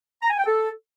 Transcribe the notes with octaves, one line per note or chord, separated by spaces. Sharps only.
A#5
G#5
G5
A4